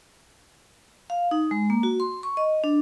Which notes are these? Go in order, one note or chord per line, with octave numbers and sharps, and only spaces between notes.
F5
D#4
G#3
A#3
F#4
C6
C#6
D#5
D4